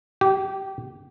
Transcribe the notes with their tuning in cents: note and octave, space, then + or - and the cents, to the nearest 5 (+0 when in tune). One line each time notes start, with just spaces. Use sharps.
G4 -20